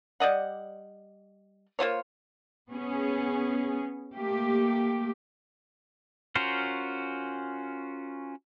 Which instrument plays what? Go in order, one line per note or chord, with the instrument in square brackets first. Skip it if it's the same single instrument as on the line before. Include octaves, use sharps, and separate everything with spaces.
[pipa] G3 D5 D#5 F#5
A#3 F4 C5 C#5
[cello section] B3 C#4 G#4
A3 A#3 G4
[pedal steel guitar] C#4 F4 F#4 A#4 C5